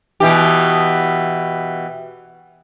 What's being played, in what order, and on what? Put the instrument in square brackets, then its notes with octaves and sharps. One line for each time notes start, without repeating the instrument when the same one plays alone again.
[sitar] B2 E3 G4